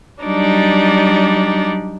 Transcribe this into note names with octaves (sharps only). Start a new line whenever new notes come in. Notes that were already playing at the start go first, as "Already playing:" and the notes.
F#3 G3 D4 D#4 D5